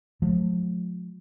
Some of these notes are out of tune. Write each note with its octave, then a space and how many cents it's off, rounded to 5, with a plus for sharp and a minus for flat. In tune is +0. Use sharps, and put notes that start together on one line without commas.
F3 +35 A3 -45